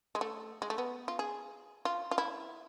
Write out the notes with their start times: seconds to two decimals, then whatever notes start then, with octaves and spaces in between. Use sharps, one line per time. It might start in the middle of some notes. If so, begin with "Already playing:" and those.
0.15 G#3
0.21 A3
0.62 G#3
0.70 A3
0.78 B3
1.08 F4
1.19 G#4
1.85 F4
2.11 F4
2.18 E4